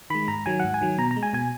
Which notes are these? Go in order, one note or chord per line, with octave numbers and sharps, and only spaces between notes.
D#3 G#3 B5
G#2 A#5
D#3 F#3 G#5
G#2 F#5
G#5
D#3 F#3
B2 A#5
A#5
G#3
G#5
B2 G#5